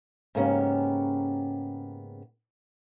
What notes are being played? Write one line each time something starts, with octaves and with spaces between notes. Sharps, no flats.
G#2 C#3 A#3 B3 C#4 G4